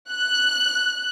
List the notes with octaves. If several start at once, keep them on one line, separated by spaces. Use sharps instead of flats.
F#6